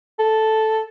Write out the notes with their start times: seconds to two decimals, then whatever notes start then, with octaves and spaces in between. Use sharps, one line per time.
0.19 A4